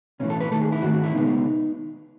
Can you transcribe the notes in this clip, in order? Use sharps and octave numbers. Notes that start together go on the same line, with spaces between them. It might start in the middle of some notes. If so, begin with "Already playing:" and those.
B1 A2 E3 C#4
A4
B4
D#2 D#3 A3 A4
G#4
E4
G#2 D#3 A3 F#4
F#4
E4
C#2 B2 G#3 B3 D#4